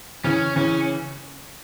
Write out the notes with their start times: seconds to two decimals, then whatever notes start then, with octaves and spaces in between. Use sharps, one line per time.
0.24 C#3 E3 C#4
0.56 C#3 E3 C#4